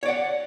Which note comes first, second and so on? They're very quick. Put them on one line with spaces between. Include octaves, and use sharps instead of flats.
C#5 D5 F#5